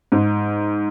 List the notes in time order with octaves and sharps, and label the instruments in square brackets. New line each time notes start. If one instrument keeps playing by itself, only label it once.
[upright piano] G#2